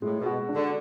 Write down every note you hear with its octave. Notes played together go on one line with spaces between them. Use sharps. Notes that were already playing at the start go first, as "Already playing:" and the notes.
A2 G#3
B2
F#4
D4
D3